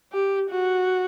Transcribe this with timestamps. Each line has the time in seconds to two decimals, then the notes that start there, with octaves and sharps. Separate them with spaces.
0.12 G4
0.50 F#4